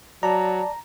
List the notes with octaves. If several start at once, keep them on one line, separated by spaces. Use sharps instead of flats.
F#3 D5 A5 A#5